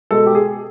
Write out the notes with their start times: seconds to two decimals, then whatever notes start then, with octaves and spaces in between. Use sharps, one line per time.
0.11 B2 G#3 A4
0.26 G4
0.35 G#4